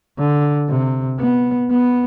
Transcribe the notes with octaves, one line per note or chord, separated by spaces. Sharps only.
D3
C3
B3
B3